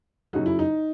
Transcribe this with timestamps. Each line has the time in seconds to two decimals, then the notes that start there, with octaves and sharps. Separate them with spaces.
0.33 F#2 C#3 F#3 D#4 F#4
0.46 E4
0.59 D#4